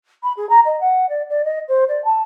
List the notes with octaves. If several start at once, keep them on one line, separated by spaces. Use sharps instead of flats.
B5
G#4
A#5
D#5
F#5
D5
D5
D#5
C5
D5
A5